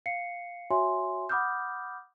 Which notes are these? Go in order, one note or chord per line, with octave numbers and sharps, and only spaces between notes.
F5 C7 C#7
F#4 C#5 E5 G#5 C6
F#5 B5 D6 D#6 F6 G6